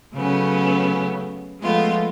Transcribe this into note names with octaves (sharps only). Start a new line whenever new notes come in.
C#3 F#3 A3 B3 C#4
F3 G#3 A3 B3 F4